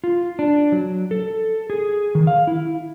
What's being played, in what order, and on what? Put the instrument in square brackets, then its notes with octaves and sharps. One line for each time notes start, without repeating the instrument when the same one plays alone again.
[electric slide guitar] F4
D4
F#3
A4
G#4
D#3
F5
E4